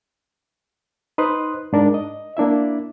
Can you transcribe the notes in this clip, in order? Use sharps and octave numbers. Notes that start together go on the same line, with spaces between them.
D#4 B4 C5 C6 D#6 F#6
G#2 D4 A#4
D#5
A#3 D4 E4 E5